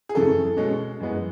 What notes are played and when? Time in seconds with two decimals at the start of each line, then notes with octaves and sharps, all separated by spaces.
0.09 G#4
0.15 F#2 C#3 E3 A3 A4
0.57 B2 G#3 C#4
1.00 F#2 E3 G#3 B3